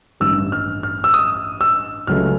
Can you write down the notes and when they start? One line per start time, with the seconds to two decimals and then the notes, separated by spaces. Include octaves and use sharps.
0.20 A1 G2 D#3 G3 E6
0.52 F6
0.83 F6
1.04 E6
1.14 D#6
1.61 E6
2.07 C#2 C#3 F#3 A3 F6